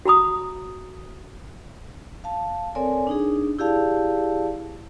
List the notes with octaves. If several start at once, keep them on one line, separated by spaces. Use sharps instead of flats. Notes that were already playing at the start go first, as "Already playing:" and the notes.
F#4 A#5 B5 D#6
F5 A5
C4 A4 A#4 C#5 D5 G#5
D4 D#4 G#4
E4 G4 G#4 D5 F5 A5